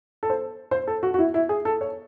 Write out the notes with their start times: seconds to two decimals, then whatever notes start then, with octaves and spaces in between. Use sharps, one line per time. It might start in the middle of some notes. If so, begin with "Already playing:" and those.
0.23 A4
0.30 C5
0.71 C5
0.87 A4
1.03 F#4
1.14 F#4
1.19 E4
1.34 E4
1.49 G#4
1.65 A4
1.81 C#5